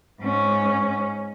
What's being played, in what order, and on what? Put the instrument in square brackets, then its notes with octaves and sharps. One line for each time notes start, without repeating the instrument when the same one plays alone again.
[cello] G#2 C#4